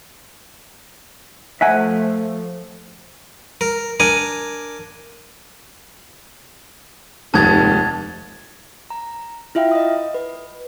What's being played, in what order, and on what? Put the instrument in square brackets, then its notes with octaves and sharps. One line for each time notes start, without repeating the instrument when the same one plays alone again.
[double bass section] F3 A3 [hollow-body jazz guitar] E5 F#5 G#5
[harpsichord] A#4
D4 A#4 G#5
[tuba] F1 [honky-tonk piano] D#2 G#2 D#6 [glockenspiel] A5 G#6 A6
[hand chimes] A#5
E4 F4 E5 F5 G5
D#5 D#6
B4